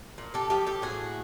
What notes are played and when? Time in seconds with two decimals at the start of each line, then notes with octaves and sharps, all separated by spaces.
0.18 A#2
0.34 G4 A4
0.50 F3 G4 A4
0.67 G4 A4
0.82 A2 F#4 G#4